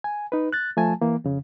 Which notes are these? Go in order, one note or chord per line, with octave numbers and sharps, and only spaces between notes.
G#5
D#4 B4
F#6 A6
F3 A3 G#5 A5
E3 A#3
F2 C#3